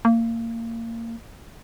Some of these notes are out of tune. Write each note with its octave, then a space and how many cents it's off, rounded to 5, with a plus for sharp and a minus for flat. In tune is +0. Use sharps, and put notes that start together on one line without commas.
A#3 -25